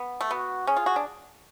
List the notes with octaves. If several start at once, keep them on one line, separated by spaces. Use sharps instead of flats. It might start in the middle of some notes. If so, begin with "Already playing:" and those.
Already playing: B3
A3
B3 F#4
C#4 G#4
F4
F#4
D4